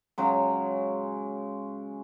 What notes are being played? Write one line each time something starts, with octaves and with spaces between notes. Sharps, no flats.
C#3 F#3 G#3